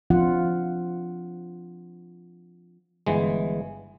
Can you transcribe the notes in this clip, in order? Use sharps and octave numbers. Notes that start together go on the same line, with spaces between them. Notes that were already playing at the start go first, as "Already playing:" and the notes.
F3 C4 D4 F4 F#5
G1 E3 G#3